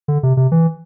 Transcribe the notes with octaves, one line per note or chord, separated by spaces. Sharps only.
D3
C3
C3
E3